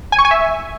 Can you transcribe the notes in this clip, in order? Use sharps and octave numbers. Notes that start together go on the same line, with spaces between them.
G#5
C#6
G#5
E5